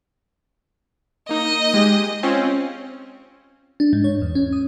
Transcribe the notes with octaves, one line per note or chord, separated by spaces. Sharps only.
A#3 D#4 D#5
G#3 G4
C4 C#4 F4
D4
G#2
C#5
E2
C#4
D#6